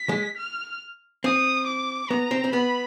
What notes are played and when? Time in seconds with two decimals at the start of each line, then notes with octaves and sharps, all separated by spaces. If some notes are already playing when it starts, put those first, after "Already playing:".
Already playing: B6
0.09 G#3
0.38 F6
1.24 C4 D#6
1.68 D6
2.10 B3 A#5
2.31 C4
2.44 C4
2.52 B3 B5